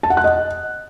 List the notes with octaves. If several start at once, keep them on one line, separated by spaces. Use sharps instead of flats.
A5
F#5
F#6
D#5